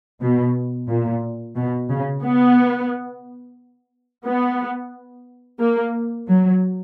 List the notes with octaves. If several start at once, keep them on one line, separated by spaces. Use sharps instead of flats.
B2
A#2
B2
C#3
B3
B3
A#3
F#3